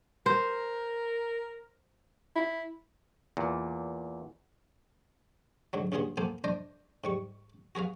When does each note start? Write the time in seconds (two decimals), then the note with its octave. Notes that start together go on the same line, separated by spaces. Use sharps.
0.26 A#4 C5
2.36 E4
3.37 E2 A#2
5.73 G#2 D3 F#3
5.92 A#1 G2 C#3 B3 G#4 C6
6.17 A#3 B3 A4 C5 G#5
6.44 D4 C5 D5 D#5
7.04 G#2 G3 C#6
7.75 F#4 G#4 B4 F5